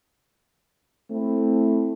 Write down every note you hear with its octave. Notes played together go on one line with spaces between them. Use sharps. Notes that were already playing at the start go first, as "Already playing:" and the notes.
A3 C4 E4